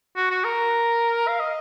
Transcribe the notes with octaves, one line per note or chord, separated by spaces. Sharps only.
F#4
F#4
A#4
F5
D#5